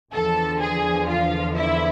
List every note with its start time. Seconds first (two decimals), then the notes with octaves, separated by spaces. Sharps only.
0.12 E2 D3 F3 A4 A5
0.60 G#4 G#5
1.08 F4 F5
1.55 E4 E5